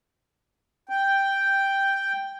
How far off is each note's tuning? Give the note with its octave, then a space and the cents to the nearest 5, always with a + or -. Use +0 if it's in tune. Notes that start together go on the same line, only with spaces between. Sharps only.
G5 +0